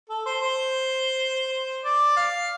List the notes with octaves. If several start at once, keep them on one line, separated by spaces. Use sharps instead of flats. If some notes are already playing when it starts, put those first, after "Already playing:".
A4
C5
C5
D5
F5